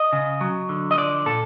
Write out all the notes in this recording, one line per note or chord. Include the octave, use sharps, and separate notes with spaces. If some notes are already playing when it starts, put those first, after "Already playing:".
Already playing: D#5
C#3
F#3
D3
D#5
F3 D5
A#2 A4